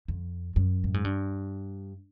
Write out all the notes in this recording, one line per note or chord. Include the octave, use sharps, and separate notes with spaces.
F2
F#2
A2
G#2
G2